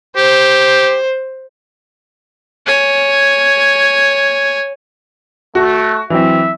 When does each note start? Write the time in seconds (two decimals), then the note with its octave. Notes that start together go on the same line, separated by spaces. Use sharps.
0.16 G4 C5
2.67 C#5 G#5
5.55 A3 F#4
6.10 E3 F#3 C4 E5